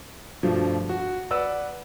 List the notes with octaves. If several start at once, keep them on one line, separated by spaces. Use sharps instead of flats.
G2 B2 F3 A3
F#4
B4 D5 F#5 E6